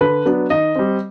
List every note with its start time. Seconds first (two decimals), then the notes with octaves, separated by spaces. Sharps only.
0.01 D3 B4
0.26 F#3 B3 D4
0.50 D#3 D#5
0.75 G3 C4